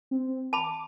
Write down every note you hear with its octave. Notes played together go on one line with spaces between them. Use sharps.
C4
A5 B5 D6